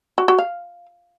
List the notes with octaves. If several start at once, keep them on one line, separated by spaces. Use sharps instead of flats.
F#4
F#4
F5